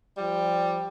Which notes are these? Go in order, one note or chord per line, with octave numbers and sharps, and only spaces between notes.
F3 G3